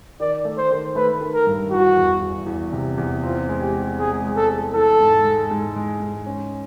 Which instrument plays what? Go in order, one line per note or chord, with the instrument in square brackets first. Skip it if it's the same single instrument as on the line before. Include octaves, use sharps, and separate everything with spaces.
[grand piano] D#3 [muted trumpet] D5
[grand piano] A3
[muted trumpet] C5
[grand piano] D#3
[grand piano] A3 [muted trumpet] B4
[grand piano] D#3
[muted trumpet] A#4
[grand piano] G2
[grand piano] E3 [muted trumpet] F#4
[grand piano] E2
E2
E2
C3
E2
[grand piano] C4 [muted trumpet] F4
[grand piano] G#3
[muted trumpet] G4
[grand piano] C4
[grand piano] G#3 [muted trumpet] G#4
[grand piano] G#3
[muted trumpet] A4
[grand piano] G#4
[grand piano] E3 [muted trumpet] A4
[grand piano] G#2
G#3
G#2
G#3
G#2
C#4